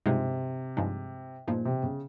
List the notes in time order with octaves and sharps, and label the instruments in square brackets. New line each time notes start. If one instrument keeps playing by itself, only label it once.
[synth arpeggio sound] G2 F3 G#3 D#4 [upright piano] C3
[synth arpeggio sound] G2 F3 G#3 D#4
[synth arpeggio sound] G2 F3 G#3 D#4 [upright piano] A#2
[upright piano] C3
C#3